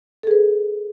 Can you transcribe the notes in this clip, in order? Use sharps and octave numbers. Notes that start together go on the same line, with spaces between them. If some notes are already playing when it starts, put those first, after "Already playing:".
G#4 A4 B4